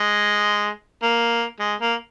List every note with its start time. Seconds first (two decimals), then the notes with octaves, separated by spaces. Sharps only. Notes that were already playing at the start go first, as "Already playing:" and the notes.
Already playing: G#3
1.03 A#3
1.60 G#3
1.80 A#3